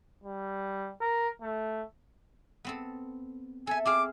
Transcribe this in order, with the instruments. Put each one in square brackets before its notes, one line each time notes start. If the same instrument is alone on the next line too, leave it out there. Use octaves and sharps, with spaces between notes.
[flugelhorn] G3
A#4
A3
[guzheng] B3 C4 A4
[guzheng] A4 E5 [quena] G#5
[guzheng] C4 G#4 F5 [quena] D6